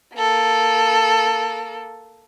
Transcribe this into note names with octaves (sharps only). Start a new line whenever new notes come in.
A#3 A4